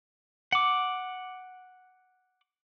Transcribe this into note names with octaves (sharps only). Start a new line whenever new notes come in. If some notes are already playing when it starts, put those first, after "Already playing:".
F#5 D6